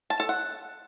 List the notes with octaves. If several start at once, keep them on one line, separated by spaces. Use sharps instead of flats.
A5
A4
F#5